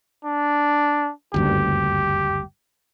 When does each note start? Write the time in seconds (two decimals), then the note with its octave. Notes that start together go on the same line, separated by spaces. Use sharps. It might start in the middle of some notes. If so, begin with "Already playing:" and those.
0.25 D4
1.34 F#1 D2 G2 G4